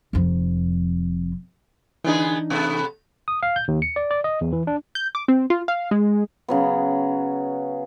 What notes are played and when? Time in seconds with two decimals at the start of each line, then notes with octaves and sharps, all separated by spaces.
0.13 F1 F2
2.04 D3 E3 B3 D4 D#4 G#4
2.50 C3 A3 B3
3.28 D#6
3.43 F5
3.56 G6
3.68 D#2
3.82 C#7
3.96 D5
4.11 D5
4.24 D#5
4.41 E2
4.52 E3
4.67 D4
4.95 G6
5.15 D6
5.28 C4
5.50 F4
5.68 F5
5.91 G#3
6.48 C#3 F#3 B3